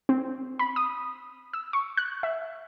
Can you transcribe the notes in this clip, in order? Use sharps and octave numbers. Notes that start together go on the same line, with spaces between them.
C4
B5
D#6
E6
C#6
F#6
E5